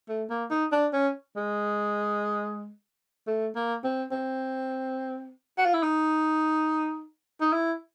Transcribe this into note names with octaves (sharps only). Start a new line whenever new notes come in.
A3
A#3
D#4
D4
C#4
G#3
A3
A#3
C4
C4
F#4
F4
E4
D#4
D#4
E4